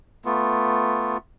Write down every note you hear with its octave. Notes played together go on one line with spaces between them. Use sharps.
A3 B3 F4